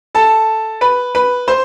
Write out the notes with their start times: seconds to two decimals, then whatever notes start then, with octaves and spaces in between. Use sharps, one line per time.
0.14 A4 A5
0.81 B4 B5
1.15 B4 B5
1.48 C5 C6